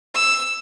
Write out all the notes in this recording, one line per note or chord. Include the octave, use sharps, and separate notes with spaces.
E6